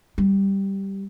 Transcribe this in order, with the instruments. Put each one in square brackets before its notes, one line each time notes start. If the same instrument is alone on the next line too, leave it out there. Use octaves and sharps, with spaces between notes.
[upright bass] G3